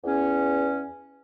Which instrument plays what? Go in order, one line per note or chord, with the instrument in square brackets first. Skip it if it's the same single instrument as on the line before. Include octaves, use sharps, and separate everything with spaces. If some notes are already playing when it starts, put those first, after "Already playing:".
[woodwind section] E2 C#4